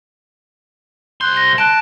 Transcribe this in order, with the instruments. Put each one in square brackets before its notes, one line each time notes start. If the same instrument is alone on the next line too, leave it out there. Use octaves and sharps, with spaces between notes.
[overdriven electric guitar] C2 C6 [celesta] F#6 G6
[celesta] A#6
[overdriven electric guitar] A5 [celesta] F#6 D7